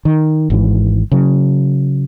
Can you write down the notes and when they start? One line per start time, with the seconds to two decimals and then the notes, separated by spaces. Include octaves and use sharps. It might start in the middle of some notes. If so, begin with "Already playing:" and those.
0.05 D#3
0.50 G#1 G#2 E3
1.12 C#3 F#3